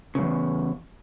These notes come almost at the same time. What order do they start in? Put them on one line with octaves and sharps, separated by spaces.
C#3 G2 E2